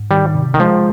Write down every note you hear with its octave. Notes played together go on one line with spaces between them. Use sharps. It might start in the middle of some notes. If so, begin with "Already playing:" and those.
Already playing: G#2
D#3 G3
C3
D#3
F3 G#3